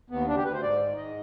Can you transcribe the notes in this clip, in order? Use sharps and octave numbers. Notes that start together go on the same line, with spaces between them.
D#2 B3
D2 D4
G4
D2 B4
C5
G#2 D5
D#3
G#2 D#5